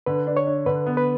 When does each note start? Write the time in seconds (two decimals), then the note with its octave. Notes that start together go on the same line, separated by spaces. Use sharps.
0.06 D3 B4
0.27 D4
0.37 C#5
0.47 D4
0.66 D3 B4
0.87 B3
0.97 B4